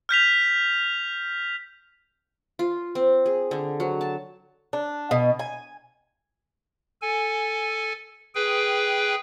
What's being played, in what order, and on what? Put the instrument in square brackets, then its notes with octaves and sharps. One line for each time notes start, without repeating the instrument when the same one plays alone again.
[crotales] F6 G6 B6 F7
[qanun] F4
C4
G#4
D3
F#3
A5
[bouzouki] D4
B2
G#5
[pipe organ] A4 G#5
G#4 B4 G5